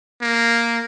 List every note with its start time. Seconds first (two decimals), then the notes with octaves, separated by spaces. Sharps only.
0.21 A#3